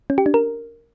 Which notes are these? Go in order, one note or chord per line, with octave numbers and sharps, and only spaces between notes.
C#4
G4
D4
A#4